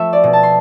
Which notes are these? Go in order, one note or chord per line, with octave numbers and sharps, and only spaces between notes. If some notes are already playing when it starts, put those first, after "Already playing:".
Already playing: F3 A3 E5
D5
B2
A5
C6